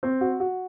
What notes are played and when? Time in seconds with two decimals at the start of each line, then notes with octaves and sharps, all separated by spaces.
0.03 C4
0.21 F#4
0.40 F#4